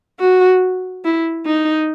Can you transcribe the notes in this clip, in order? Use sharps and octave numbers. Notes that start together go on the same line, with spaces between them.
F#4
E4
D#4